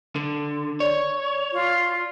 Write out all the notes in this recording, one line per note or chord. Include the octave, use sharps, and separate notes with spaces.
D3
C#5 D5
F4